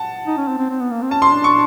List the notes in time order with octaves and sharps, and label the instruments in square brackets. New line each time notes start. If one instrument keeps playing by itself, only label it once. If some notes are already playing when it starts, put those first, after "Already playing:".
Already playing: [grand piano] F#5 A5
[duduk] D#4
C#4
C4
C4
C4
B3
A#3
C4
[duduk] C#4 [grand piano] A5
[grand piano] C6
[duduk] D4
[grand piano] C#6